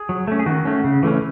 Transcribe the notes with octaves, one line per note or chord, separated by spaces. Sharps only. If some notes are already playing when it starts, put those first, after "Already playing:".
Already playing: G#4
F#3
A3 C#4
G#4
D#3 F#4
A3 C#4
C#3
E3 A3 C#4